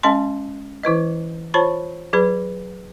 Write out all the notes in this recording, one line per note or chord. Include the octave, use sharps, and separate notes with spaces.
G#3 C#4 D#5 A5 C6
E3 E4 B4 D#5
F4 C5 C#5 A5 B5 C#6
F#3 G#4 B4 B5